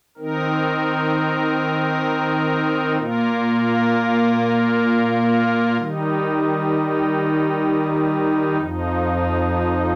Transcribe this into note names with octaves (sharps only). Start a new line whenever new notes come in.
D#3 C4 D#4 A#4
A#2 A#3 F4 A#4
D#3 G3 D#4
F2 F3 D#4